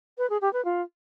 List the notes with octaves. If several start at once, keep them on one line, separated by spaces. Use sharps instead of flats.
B4
G#4
G4
B4
F4